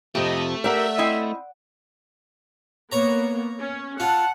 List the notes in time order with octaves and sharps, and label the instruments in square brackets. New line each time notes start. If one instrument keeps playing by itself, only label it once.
[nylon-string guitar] F2 C3 [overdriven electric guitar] A3 [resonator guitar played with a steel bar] G4 [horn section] D#5
[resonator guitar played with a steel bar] G4 A#4 [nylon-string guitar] D5 F#5 [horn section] E5
[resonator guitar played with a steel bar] C4 E4 D#5
[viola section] A#3 B3 [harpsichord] C#5 A#5
[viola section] C#4
[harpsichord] F4 [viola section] F#5 [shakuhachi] A5